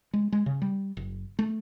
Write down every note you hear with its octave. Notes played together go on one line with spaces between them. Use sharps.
G#3
G#3
C#3
G3
F#1
A3